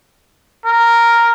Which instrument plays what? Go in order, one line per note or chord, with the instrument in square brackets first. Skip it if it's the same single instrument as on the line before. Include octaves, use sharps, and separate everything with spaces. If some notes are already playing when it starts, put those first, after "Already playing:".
[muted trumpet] A#4